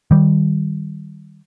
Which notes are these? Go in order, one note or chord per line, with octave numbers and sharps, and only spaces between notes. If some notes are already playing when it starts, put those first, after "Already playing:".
D#3 G3